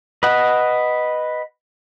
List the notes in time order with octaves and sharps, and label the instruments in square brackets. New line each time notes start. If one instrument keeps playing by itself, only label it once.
[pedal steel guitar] B4 D#5 F#5